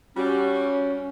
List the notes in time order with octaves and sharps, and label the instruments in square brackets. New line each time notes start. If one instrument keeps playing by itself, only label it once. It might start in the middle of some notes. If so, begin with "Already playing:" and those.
[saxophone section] G3 F#4 [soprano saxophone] C#4